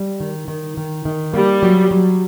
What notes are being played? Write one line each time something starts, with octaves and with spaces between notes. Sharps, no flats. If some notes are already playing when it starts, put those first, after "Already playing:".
Already playing: G3
D#3
D#3
D#3
D#3
G3 A#3
F#3
F#3